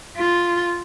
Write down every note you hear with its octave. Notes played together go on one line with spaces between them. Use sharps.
F4